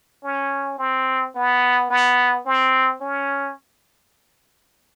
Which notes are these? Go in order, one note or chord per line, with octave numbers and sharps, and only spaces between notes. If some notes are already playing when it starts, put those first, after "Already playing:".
C#4
C4
B3
B3
C4
C#4